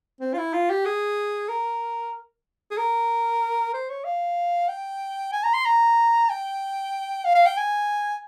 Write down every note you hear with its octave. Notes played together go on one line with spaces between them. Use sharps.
C4
F4
E4
F4
G4
G#4
A#4
G#4
A#4
C5
C#5
F5
G5
G#5
A#5
C6
A#5
G5
F5
F5
G5
G#5